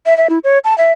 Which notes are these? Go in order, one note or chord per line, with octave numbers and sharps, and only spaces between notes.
E5
E5
E4
C#5
A5
E5